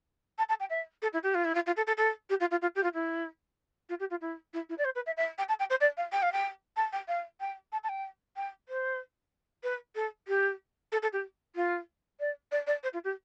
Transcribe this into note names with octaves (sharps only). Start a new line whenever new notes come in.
A5
A5
G5
E5
A4
E4
G4
F4
E4
F4
F4
A4
A4
A4
G4
F4
F4
F4
G4
F4
E4
F4
G4
F4
E4
E4
E4
D5
C5
B4
E5
E5
G5
A5
G5
C5
D5
F5
G5
F5
G5
A5
G5
F5
G5
A5
A5
G5
G5
C5
B4
A4
G4
A4
A4
G4
F4
D5
D5
D5
C5
F4
G4